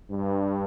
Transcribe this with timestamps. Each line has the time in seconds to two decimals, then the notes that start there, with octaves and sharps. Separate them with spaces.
0.11 G2